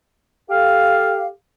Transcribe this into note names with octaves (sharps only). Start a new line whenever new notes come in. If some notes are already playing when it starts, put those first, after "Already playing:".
G4 A4 F5